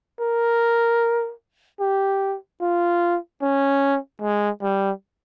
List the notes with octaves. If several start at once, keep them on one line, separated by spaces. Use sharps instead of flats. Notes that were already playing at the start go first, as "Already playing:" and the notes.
A#4
G4
F4
C#4
G#3
G3